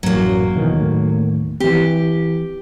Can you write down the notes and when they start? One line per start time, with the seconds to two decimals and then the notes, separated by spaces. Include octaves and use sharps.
0.03 A1 F#2 A#2 F#3 A#3
0.55 B2 D#3 E3
0.74 D#2 A2
1.60 E3 C4 G4